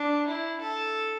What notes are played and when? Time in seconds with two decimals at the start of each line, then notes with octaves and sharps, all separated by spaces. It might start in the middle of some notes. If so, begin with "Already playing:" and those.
Already playing: D4
0.27 E4
0.61 A4